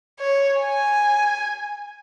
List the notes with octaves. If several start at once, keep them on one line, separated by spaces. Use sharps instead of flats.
C#5
G#5